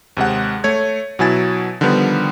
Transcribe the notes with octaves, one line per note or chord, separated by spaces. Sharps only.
D#2 C3 G#3 F#5
A3 C#5 G#6
B2 F#3 E4 G#5 A6
D3 D#3 F3 G3 B3